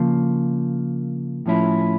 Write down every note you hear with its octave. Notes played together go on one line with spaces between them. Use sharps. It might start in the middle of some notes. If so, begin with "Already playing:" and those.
Already playing: C#3 F3 A#3
A2 F3 C#4 E4